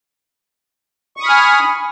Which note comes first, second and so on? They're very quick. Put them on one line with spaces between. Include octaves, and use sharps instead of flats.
C#6 D#6 B5 F6 G#5